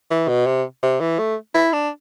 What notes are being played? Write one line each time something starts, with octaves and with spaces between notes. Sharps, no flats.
E3
B2
C3
C3
E3
A3
E4
D4